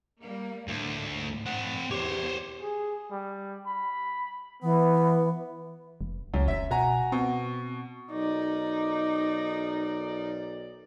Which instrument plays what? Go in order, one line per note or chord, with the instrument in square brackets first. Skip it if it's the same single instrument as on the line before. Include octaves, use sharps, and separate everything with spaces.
[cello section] G3 A#3
[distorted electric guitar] D2 [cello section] A2
[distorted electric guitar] C4 F#5
[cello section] E2 [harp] G4 [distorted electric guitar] C5 C#5
[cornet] G#4
G3
B5
[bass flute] E3 [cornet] B3
[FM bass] F1
[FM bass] C#2 [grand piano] F#2
[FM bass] F1 [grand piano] E5 B6
[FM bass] B2 [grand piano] F#4 G#5 A#5
[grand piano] B2 [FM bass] C4
[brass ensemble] B1 A#4 D5 [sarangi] D#4